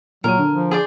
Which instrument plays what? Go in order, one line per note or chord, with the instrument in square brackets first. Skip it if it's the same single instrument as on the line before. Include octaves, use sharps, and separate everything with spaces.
[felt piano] A#2 D#7 [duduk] F#3 [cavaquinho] A#4
[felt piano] D3
[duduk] F3
[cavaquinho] G#4 C5 D5